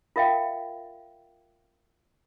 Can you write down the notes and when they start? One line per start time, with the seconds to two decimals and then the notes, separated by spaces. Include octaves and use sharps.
0.16 F4 A#4 E5 F5 G5